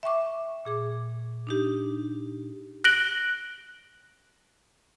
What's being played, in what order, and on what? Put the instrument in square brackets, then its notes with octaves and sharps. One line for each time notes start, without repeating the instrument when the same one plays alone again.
[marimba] E5 G5 C#6 D6
A#2 G#4 D6
D4 D#4 G4
[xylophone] F#6 A#6 D7 F#7 G7